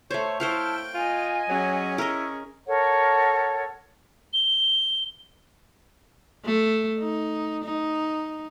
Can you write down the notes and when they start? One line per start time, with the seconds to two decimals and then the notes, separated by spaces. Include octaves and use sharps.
0.11 A3 C5 C#5
0.40 E4 C5 C#5 F5 G5 A5 F6
0.94 F4 D#5 G#5
1.49 F#3 C#4 G#4
1.98 E4 A#4 C#5 D#5
2.68 A4 A#4 C#5 F#5
4.33 G7
6.45 A3
6.99 D#4
7.64 D#4